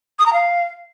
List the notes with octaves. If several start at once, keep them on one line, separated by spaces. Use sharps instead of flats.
D#6
A#5
F5